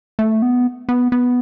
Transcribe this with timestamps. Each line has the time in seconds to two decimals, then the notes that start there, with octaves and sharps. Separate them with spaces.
0.19 A3
0.42 B3
0.89 B3
1.12 B3